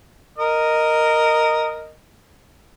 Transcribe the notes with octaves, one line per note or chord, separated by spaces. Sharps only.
A#4 D#5